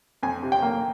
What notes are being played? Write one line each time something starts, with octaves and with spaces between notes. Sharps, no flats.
F2 G#5
C3
G5
A#3